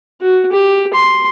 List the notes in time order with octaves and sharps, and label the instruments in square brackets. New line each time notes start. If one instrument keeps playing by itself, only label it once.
[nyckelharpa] F#4
G4
C6